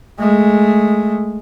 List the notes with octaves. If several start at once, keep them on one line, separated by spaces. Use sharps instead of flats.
G#3 A3